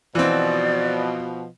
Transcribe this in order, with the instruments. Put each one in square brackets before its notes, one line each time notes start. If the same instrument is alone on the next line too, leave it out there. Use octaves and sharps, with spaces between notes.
[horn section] B2 F3 [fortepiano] E3 C4 [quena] D5